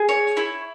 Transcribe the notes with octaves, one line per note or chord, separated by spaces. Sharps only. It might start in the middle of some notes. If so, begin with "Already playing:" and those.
Already playing: G#4
C#5
E4